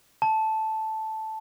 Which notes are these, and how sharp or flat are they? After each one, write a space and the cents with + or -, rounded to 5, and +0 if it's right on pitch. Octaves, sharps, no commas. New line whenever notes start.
A5 -5